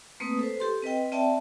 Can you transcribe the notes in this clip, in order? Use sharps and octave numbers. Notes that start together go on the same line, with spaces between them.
A3 A#3 C4 B4 D#6
A4 B4 C5
G4 A4 C6
C4 B4 D#5 G5
C4 D5 E5 G5 A5